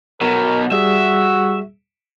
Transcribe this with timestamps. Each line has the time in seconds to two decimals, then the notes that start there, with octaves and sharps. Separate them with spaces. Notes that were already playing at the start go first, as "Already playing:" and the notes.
0.21 B2 F#3 A#4
0.72 G3 F#4 G#4 E5